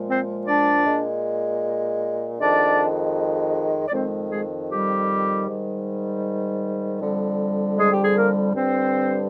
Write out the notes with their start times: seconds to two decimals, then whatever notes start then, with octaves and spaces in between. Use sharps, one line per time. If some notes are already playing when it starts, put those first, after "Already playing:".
Already playing: A#2 F3 G#3
0.09 C4 C5
0.47 D4 D5
0.86 A#2 G#3
2.39 F2 D#3 G#3 D4 D5
3.88 D5
3.93 F2 D#3 G#3 C4 C5
4.32 G#3 G#4
4.70 G3 G4
5.47 G#2 D#3 G3
7.00 F2 D3 G3
7.77 G#3 G#4
7.90 G4
8.03 G#4
8.16 A#3 A#4
8.54 G2 D3 G3 C4 C5